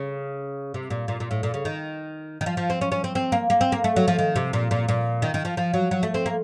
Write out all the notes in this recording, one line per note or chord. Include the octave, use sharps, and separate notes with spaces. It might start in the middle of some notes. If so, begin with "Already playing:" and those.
Already playing: C#3
C3
A#2
A#2
A#2
A2
A#2
C#3
D#3
D#3
F3
F3
C4
C#4
C#4
C4
C4
A#3
A#3
C4
A#3
A3
F#3
F3
D#3
C3
A#2
A#2
A#2
D#3
D#3
F3
F3
F#3
F#3
A3
C4
A#3